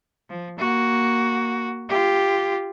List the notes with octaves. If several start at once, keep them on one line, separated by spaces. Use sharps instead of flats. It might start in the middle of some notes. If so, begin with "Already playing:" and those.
F3
A#3 F#4
F4 G4